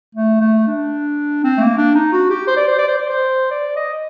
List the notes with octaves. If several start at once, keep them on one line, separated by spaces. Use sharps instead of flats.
A3
A3
D4
C4
A3
A#3
D4
D#4
F#4
G4
C5
D5
C5
D5
C5
D5
C5
D5
D#5